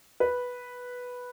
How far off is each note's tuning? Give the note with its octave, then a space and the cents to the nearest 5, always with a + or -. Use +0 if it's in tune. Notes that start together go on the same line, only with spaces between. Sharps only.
B4 -5